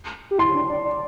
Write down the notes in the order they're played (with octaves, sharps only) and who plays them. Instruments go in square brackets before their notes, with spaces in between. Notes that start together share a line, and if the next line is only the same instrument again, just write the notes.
[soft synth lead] G4
[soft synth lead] E4 [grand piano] C6
[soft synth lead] D4
D5
D5